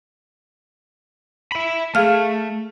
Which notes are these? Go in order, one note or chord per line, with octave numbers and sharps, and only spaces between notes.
E5 B5
A3 G#4 F5 F6